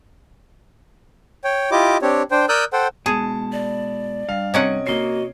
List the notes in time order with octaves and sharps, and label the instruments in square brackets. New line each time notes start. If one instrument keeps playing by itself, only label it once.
[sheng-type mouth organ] C#5 G5
E4 F4 G4 D#5 D6
C4 D4 G4 C#5
D4 C5 G5
A#4 D5 D#6 E6 F#6 G6
A4 C5 F#5 G5
[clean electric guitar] B2 G#3 [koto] G#4 [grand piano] A5
[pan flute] D5
[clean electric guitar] G2 [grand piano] F5
[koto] C3 C#4 F#5 [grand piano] D#5 G#6 D7
[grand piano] A#3 C7 [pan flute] F#4 [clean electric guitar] C#5 D#5